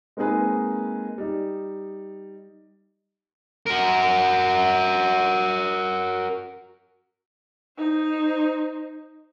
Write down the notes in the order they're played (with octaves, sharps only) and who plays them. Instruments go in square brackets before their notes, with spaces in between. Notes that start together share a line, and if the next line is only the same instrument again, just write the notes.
[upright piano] G#3 A#3 C4 D#4 G#4 B4
G3 D#4
[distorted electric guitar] F#4 A#4
[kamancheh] D#4 C5